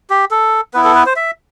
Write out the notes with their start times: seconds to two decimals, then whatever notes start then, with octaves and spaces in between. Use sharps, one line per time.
0.10 G4
0.31 A4
0.74 B3 E4 B4
0.84 A4
0.95 B4
1.06 C5
1.16 E5